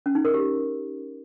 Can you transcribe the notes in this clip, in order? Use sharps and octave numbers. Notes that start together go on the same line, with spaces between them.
C#4
D#4
A#4
G4